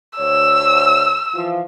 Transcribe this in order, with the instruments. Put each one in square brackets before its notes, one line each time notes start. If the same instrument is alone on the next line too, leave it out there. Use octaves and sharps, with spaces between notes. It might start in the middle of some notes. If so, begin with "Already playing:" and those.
[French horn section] D2 C#5 [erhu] E6
[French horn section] E3 F3 F4